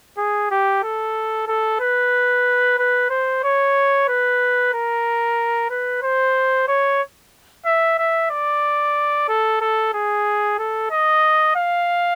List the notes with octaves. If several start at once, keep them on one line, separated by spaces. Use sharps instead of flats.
G#4
G4
A4
A4
B4
B4
C5
C#5
B4
A#4
B4
C5
C#5
E5
E5
D5
A4
A4
G#4
A4
D#5
F5